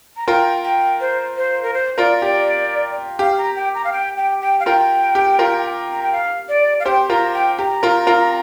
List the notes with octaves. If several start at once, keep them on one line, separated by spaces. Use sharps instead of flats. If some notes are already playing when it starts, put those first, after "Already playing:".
A#5
F4 A#4 G5
G5
C5
C5
A#4
C5
F4 A#4 D5
G4 D5
G4 F5
A#5
G5
A#5
F5
G5
G5
G5
F5
F4 A#4 G5
G4
F4 A#4
A#5
G5
F5
D5
F5
G4 C5 G5
F4 A#4 A#5
G5
G4 A#5
F4 A#4
F4 A#4